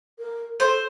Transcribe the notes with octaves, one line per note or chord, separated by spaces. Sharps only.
A#4
A4 C5